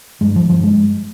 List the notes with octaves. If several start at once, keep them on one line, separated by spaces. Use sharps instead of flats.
G2 G#3
F3
G2 F3
G#3